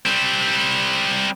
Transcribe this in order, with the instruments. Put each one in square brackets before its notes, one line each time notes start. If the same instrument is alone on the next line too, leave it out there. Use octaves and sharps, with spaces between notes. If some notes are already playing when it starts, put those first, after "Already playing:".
[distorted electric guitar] G3 C4